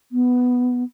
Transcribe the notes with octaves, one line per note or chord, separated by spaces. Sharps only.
B3